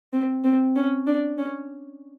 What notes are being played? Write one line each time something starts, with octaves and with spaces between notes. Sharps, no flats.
C4
C4
C#4
D4
C#4